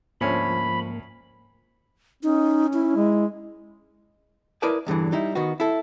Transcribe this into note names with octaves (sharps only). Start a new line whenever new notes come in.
D2 G#2 F3 A#3 C#4 B5
C#4 D#4
E4
G#3
E4 A#4 B4 D5 D#5 A5
E2 G2 D3 E3
G3 D#4 E4
D#3 B3 F#4
E4 A4